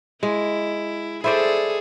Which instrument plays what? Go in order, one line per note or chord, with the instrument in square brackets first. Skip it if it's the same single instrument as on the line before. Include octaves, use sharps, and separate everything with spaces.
[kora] G#3 [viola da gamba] E4
[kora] E4 C5 D5 [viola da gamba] G#4 A4